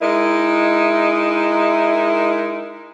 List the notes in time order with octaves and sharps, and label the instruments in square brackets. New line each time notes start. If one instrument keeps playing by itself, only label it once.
[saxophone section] G#3 D#4 E4 A#4